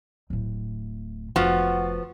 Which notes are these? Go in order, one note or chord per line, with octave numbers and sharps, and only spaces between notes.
D1 A2
F1 F3 B3 F#4